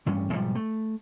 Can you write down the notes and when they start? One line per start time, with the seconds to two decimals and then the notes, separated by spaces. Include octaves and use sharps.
0.06 A1 G2 G3 C#4
0.32 B1 G#2 F3 G3
0.55 A3